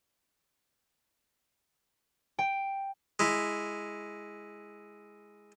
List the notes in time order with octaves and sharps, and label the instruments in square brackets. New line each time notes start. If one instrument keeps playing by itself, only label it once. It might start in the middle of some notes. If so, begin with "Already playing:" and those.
[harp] G5
[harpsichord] G#3 E4